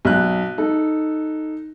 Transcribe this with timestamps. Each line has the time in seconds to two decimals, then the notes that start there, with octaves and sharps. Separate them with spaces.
0.05 B1 F#6
0.58 D#4 A4